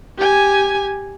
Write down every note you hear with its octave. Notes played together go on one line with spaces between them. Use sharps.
G4 G#5